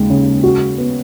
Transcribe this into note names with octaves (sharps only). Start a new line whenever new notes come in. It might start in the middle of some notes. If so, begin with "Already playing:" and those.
Already playing: D#2 C#3 G#3
C#3
F#4
B3